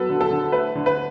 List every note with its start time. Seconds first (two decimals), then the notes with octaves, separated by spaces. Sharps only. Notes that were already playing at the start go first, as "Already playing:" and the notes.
Already playing: F#3 B3 A4 B4
0.09 D3
0.21 A4
0.31 D3
0.52 A3 B4
0.75 D3
0.86 B4